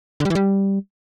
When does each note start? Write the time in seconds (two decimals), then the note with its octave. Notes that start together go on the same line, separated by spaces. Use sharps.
0.20 D3
0.25 G3
0.30 E3
0.35 G3